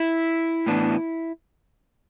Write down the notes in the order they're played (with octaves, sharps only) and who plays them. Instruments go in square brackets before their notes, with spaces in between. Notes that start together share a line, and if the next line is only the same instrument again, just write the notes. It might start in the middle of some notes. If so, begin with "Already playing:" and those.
Already playing: [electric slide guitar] E4
A2 E3 B3 D4